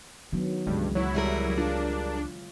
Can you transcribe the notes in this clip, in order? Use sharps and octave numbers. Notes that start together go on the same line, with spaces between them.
D#3 F#3 B3 D4
C#2 G2 C#3 E3 G#3
F#3 E4 C#5
G3 G#4 A#4
D4 F4